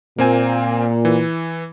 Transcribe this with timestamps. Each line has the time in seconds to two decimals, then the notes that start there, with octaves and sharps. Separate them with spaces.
0.18 A#2 A#3 C4 G#5
1.05 E3